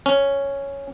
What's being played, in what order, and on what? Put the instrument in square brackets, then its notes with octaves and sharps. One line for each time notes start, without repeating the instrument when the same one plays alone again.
[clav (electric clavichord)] C#4